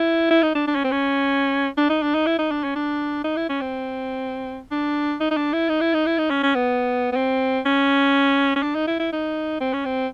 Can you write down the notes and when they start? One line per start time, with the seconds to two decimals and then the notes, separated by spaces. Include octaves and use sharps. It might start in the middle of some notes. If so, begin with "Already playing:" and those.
Already playing: E4
0.31 E4
0.43 D#4
0.55 D4
0.68 D4
0.75 C#4
0.84 C4
0.92 C#4
1.78 D4
1.90 D#4
2.03 D4
2.15 D#4
2.27 E4
2.39 D#4
2.51 D4
2.64 C#4
2.76 D4
3.24 D#4
3.37 E4
3.49 C#4
3.61 C4
4.71 D4
5.20 D#4
5.31 D#4
5.37 D4
5.53 E4
5.69 D#4
5.81 E4
5.94 D#4
6.06 E4
6.18 D#4
6.30 C#4
6.43 C#4
6.55 B3
7.12 B3
7.16 C4
7.66 C#4
8.56 C#4
8.63 D4
8.75 D#4
8.87 E4
9.00 E4
9.13 D#4
9.61 C4
9.73 C#4
9.85 C4